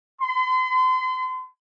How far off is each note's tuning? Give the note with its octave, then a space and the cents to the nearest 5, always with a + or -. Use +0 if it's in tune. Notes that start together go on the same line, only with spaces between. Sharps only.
C6 -35